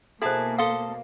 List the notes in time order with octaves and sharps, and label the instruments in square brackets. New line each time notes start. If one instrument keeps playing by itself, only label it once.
[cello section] B2 A#3 [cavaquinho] E4 G#4 A5 [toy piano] A4 C5
[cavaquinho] A4 C6 D#6 [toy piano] F5